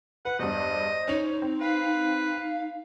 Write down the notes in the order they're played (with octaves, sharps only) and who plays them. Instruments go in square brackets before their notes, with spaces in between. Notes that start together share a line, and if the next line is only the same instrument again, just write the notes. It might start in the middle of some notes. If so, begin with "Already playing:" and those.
[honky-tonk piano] B4 [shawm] F#5
[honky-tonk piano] E2 G2 [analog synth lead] C5 [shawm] D#5
[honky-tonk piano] C#4 F7 [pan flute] D#4
[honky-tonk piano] C4
[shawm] B4 [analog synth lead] F5